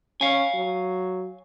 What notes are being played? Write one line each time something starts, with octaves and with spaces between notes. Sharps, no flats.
C#4 F5 G#5
F#3